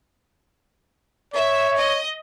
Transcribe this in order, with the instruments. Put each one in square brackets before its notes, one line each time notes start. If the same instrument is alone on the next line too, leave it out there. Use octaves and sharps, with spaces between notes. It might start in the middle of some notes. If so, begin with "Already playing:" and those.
[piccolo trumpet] C#5 [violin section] E5
[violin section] D#5